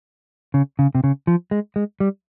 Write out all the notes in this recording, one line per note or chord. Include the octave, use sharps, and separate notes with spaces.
C#3
C#3
C3
C#3
F3
G#3
G#3
G3